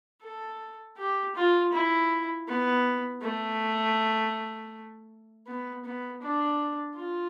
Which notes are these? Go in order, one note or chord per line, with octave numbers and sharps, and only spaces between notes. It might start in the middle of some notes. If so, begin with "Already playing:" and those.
A4
G4
F4
E4
B3
A3
B3
B3
D4
F4